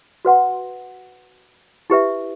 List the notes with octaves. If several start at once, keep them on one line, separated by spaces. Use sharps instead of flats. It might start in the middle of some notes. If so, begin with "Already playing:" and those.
F#4 B4 F#5 C6
E4 G4 B4 E5